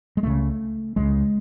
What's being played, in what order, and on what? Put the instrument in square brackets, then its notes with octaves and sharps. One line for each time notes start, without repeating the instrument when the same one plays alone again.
[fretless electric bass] G#3
C#2 C#3 A3
C#2 C#3 G#3